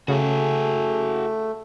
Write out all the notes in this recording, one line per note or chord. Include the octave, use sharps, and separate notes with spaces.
C#3 A3 F#4 G#4